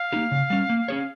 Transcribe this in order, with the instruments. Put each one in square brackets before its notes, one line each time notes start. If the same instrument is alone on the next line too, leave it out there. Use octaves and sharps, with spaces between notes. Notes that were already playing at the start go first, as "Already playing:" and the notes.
Already playing: [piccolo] F5
[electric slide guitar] A#3 D#4 G4
C#3
G3 C#4
A#3
C#4 G#4 C#5